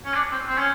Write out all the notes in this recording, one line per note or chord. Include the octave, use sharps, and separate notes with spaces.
C#4
D4
C4
C4
C#4